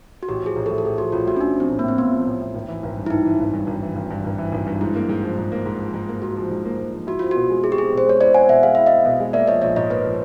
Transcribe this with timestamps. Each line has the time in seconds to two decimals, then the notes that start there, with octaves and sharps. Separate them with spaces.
0.23 F#4
0.28 A1 G4
0.42 F3 G#4
0.56 A1
0.66 G4 A4
0.71 A2
0.78 A4
0.85 A1 G#4
0.98 F3 F#4
1.12 A1 F4
1.27 A2 F#4
1.36 C#4
1.41 A1 D4
1.55 F3 C4
1.70 A1
1.79 A#3
1.84 A2 C4
1.97 A1 B3
2.12 F3
2.26 A1
2.41 A2
2.55 G#1
2.68 E3
2.83 G#1
2.97 G2
3.06 E4
3.10 G#1 D#4
3.25 E3
3.40 G#1
3.54 G2
3.67 G#1
3.82 E3
3.96 G#1
4.10 G2
4.25 G#1
4.38 E3
4.52 G#1
4.67 G2
4.81 G#2 E4
4.95 A#3
5.09 G#2
5.23 F3
5.37 G#2
5.52 A#3
5.66 G#2
5.80 F3
5.94 G#2
6.09 A#3
6.22 G#2 F#4
6.37 F3
6.51 G#2
6.65 A#3
6.79 G#2
6.93 F3
7.07 E4 F#4
7.19 C4 F4
7.31 B2 F#4
7.50 G#3
7.64 E4 G#4
7.72 G4
7.78 C4 G#4
7.92 B2
7.98 C5
8.06 G#3 C#5
8.20 E4 C5 D5
8.34 C4 F#5 G#5
8.49 B2 E5 F#5
8.63 G#3 F5
8.75 E4 E5
8.86 C4 D#5 F5
9.05 B2
9.20 G#3
9.33 A#3 D5 E5
9.48 F3 C#5 D#5
9.62 A#1 C#5 D#5
9.76 G#2 C#5 D#5
9.90 A#3 B4 C#5
10.05 F3